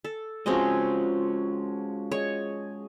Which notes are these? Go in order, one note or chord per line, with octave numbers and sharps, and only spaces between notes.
A4
F3 G#3 C4 C#4 F#4 G#4 D#5 C6
G#4 C#5 D#5